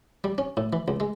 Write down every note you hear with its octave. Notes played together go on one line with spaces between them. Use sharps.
G3
C#4
A2
E3
C#2
G#3